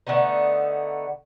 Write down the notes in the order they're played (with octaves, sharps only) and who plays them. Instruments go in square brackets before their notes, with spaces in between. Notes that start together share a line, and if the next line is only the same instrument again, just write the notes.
[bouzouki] D3 A3 B3 D#4